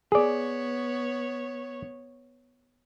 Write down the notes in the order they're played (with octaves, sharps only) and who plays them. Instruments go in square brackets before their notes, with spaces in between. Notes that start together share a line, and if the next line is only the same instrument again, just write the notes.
[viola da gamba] B3 C#5 [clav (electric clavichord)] G#4 D5